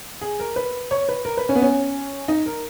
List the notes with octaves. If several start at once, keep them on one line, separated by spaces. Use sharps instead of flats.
G#4
A#4
B4
C#5
B4
A#4
B4
C#4
B3
C#4
D#4
A#4